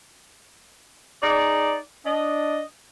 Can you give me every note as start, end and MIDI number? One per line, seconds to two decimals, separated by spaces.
1.22 1.77 63
1.22 1.77 68
1.22 1.77 74
2.05 2.61 62
2.05 2.61 75